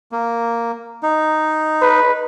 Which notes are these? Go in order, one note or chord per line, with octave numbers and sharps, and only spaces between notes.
A#3
D#4
B4